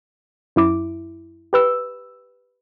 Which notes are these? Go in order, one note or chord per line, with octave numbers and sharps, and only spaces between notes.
F#2 E4 D6
G4 B4 E6